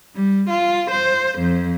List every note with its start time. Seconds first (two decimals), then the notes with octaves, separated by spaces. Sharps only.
0.15 G3
0.50 F4
0.91 C5
1.39 F2